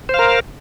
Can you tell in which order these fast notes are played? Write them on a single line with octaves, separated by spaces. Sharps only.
C5 F5 A#4